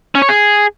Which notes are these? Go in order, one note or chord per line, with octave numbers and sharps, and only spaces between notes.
C#4
C#5
G#4